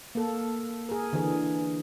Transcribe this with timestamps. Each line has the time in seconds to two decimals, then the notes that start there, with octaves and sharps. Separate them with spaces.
0.15 A#3 A4
0.89 G#4 A#4
1.13 D3 E3 G#4